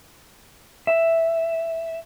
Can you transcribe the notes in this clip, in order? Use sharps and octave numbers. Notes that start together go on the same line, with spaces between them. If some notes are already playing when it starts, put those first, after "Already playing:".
E5